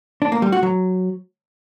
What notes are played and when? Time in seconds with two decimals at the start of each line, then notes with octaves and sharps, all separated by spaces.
0.22 D4
0.32 A#3
0.42 G3
0.52 F#4
0.63 F#3